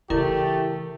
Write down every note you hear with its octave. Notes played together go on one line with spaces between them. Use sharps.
C#3 E3 A3 E4 G4 A#4